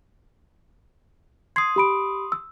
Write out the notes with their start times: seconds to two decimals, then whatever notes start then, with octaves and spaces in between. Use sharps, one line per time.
1.56 C6 D#6 G#6 C7
1.76 G4 B5 D7
2.32 E6